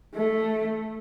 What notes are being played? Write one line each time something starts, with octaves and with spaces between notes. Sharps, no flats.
A3